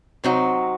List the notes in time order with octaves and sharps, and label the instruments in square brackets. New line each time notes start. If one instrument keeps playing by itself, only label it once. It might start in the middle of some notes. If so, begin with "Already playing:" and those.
[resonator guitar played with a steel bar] C3 F#3 C4 D#4 F#4